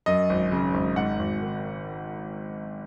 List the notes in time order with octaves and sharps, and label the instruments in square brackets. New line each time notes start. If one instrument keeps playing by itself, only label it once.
[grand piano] F#2 D#5
G#1
C#3
G#1
G#2 F#5
G#1
D#3